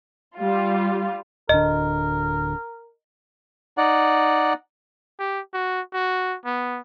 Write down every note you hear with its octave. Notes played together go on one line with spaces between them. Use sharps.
G3 F4
D1 D3 A#4 D#5
D#4 D5 F#5
G4
F#4
F#4
B3